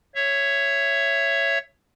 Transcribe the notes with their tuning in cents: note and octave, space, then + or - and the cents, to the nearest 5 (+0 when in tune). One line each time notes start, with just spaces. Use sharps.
C#5 +0 E5 +15